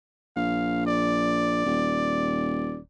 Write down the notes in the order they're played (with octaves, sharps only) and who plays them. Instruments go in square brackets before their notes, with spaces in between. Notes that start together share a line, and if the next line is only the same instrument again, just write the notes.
[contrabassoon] A#1 [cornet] F5
[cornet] D5
[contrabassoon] D#1